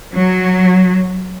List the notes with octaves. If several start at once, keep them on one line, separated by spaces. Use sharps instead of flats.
F#3